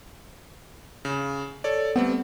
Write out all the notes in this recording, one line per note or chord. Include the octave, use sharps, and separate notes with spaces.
C#3
A4 C#5 D5
G3 A3 B3 C4